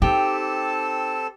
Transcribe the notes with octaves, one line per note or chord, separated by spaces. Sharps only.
C4 D#4 G4 A4 A5